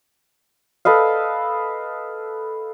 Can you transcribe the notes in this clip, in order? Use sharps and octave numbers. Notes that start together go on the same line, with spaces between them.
A4 B4 D#5 F5